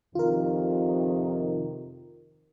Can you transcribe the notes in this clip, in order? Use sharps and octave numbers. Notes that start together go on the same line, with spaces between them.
F2 C3 D#3 F4 A#4